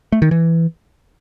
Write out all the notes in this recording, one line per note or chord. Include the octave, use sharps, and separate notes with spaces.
A3
D#3
E3